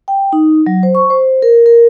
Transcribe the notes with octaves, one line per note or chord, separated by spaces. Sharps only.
G5
D#4
F#3
C5
C#6
C5
A#4
A#4